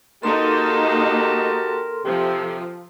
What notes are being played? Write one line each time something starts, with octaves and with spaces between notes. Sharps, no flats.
A#3 D#4 F#4 G4 A4 A#4 A5 C6
C3 F3 G4